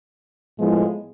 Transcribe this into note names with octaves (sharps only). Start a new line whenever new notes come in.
A2 F3 G#3 B3 E4